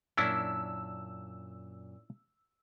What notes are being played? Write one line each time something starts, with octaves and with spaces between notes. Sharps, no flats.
F#2 A#2 C#4 D4 E4 A5 E6